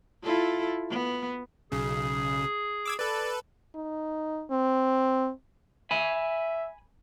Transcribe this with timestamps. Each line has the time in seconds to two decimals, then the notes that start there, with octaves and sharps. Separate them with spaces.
0.23 E4 F4 A4
0.90 B3
1.72 B1 C#3 G#4
2.86 D6 E6 G#6
2.99 A4 B4 D5
3.75 D#4
4.51 C4
5.91 E5 G#5 B5